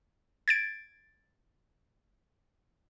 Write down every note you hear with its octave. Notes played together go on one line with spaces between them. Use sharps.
G#6 A6 D7